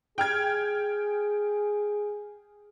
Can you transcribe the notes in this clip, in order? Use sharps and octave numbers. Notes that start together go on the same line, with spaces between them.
G#4 G5 F6 G#6